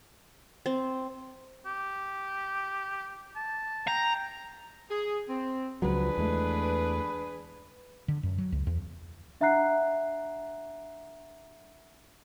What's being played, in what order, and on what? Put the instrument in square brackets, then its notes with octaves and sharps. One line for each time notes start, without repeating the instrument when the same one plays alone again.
[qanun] C4
[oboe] G4
A5
[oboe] G5 [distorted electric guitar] A#5
[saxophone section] G#4
C4
[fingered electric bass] C#2 F3 F#3 [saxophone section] D4 G#4 B4
[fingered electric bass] E2 G#3 A3
[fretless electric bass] D3
F#2
F#3
C#2
E2
[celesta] D4 E5 F#5 A#5 F#6 C7